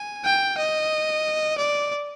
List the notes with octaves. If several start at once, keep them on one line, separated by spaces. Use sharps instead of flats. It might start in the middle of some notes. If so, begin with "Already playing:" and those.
Already playing: G#5
G5
D#5
D5